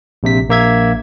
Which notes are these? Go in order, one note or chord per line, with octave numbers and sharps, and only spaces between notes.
A#1 C3 B6
A#1 A#3 E5 G#6